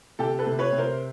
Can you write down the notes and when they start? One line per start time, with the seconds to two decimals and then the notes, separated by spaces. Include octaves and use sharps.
0.19 C3 G4 A4
0.39 A4 B4
0.46 C3
0.59 B4 C#5
0.72 C3
0.78 A#4 C5